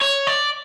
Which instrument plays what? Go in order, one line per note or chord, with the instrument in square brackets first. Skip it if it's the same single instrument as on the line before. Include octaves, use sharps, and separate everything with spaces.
[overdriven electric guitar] C#5
D5